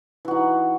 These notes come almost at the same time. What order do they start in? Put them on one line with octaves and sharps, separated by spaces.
E3 F#4 D#4